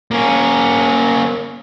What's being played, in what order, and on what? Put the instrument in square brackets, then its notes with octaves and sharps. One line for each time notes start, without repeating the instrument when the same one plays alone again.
[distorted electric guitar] A#3 C#4